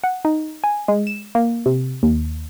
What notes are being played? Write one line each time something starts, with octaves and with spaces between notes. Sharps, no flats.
F#5
D#4
G#5
G#3
E7
A#3
C3
D#2